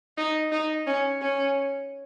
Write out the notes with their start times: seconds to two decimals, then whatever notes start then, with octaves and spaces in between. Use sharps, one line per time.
0.17 D#4
0.52 D#4
0.87 C#4
1.22 C#4